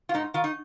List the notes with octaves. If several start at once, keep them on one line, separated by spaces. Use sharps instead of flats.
F4
G#2 D#4
D#3 F4
D#4